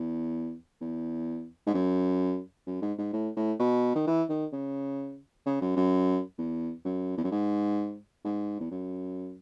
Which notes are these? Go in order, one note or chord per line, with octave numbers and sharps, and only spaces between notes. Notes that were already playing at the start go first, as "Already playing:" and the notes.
Already playing: E2
E2
G#2
F#2
F#2
G#2
G#2
A2
A2
B2
D#3
E3
D#3
C#3
C#3
F#2
F#2
E2
F#2
E2
F#2
G#2
G#2
E2
F#2